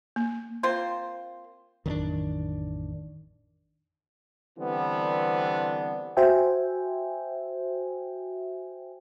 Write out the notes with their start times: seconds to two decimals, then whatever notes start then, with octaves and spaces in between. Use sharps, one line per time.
0.16 A#3
0.63 A#3 C4 F4 C5
1.86 A1 F2 D#3 F#3 C#4 D4
4.59 D3 E3 G3 B3 C4 D4
6.17 F#4 C5 E5 G5 G#5